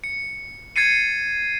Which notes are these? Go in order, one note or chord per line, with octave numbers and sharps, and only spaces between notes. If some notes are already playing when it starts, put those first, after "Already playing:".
C#7
G#6 A6 C7 C#7 D#7